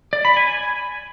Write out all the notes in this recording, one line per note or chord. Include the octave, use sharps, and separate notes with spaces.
D5
B5
G#5